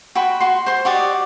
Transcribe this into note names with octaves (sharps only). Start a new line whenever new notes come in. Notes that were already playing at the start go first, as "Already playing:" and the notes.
F#4 G5 B5 C6
F#4 C6
C5 C6
F#4 G4 D5 D#5